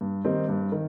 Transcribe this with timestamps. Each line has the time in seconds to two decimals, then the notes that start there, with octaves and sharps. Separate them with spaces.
0.01 G2
0.24 D#3 G3 C4 D#4
0.49 G2
0.72 D#3